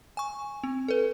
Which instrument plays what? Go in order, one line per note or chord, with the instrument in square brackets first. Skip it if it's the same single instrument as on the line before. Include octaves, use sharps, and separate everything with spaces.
[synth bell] G#5 C#6
C4
A4 B4